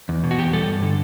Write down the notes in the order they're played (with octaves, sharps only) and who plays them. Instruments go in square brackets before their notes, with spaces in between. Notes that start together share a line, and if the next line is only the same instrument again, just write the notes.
[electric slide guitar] E2
B2
F#4
E2 G4
G3 A4
G2
D3